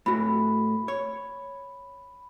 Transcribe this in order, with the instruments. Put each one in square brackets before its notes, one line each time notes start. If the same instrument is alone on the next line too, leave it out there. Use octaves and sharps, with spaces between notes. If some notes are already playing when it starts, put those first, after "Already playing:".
[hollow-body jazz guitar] A2 F#4 [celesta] B5
[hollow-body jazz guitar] C#5